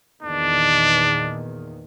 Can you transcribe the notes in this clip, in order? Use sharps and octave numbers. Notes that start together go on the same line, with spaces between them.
E2 A#2 D#3 D4